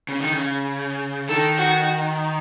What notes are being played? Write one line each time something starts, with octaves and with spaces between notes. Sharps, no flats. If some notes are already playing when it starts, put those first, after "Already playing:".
C#3
D#3
C#3
D#3 A4
F#4